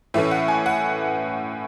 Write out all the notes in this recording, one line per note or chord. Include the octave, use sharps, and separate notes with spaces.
A2 E3 A3 C#4 E5
F#5
G#5
F#5